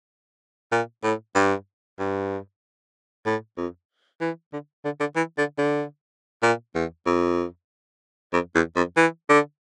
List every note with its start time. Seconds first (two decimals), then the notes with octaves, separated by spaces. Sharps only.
0.71 A#2
1.03 A2
1.35 G2
1.99 G2
3.26 A2
3.57 F2
4.21 E3
4.53 D3
4.84 D3
5.00 D3
5.16 E3
5.37 D3
5.58 D3
6.42 A#2
6.75 E2
7.06 F2
8.33 F2
8.55 E2
8.76 F2
8.97 E3
9.29 D3